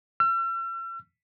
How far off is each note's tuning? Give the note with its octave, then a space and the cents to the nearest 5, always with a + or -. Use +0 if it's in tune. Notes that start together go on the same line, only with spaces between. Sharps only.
E6 +45